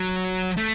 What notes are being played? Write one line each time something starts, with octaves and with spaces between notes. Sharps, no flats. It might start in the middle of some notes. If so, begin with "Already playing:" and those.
Already playing: F#3
A3